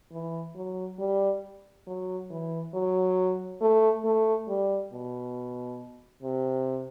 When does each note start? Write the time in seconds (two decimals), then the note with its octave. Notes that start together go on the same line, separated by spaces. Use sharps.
0.12 E3
0.55 F#3
0.99 G3
1.87 F#3
2.30 E3
2.74 F#3
3.61 A3
4.05 A3
4.48 G3
4.93 B2
6.23 C3